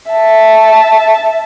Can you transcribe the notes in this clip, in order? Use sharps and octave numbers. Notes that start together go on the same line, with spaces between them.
E5 A5